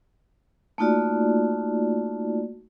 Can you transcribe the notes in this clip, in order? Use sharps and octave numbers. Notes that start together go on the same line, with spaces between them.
A3 A#3 D#4 F4 F#4 D5